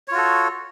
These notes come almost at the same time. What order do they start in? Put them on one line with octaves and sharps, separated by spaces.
C#5 F4 F#4 A4